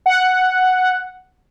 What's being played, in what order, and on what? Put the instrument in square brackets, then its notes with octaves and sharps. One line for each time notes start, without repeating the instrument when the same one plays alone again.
[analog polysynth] F#5